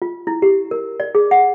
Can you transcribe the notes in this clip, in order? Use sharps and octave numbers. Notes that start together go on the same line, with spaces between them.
F4
E4
G4
A#4
D5
G#4
F#5